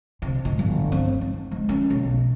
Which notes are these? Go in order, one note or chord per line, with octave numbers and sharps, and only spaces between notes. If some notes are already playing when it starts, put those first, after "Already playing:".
C3
G#2
G1
C4
D#4
G#3
C#4
B1